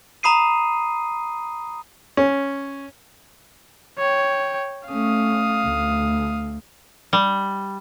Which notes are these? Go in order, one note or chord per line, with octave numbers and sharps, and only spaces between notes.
A#5 B5 D#6 C7 D#7
C#4
C#5 G5
A3 C#4 F5 D#6
D2
G3